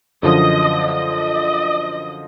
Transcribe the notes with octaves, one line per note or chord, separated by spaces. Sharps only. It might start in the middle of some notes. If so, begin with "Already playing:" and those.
F#2 D3 F3 D#5
D#5